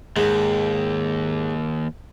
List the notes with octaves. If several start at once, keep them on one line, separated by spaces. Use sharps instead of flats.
D#2 G#2 G#3